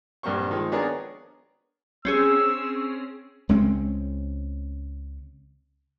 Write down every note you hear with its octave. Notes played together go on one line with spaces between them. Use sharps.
A#1 G2 A#3 C4 C5 C#6
D#3 F3 G#3
B3 D4 G#4 A#4 C#5
C4 C#4 G#4 E6
C#2 G#3 C4 C#4